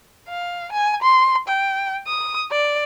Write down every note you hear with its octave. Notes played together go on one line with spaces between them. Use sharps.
F5
G#5
C6
G5
D#6
D5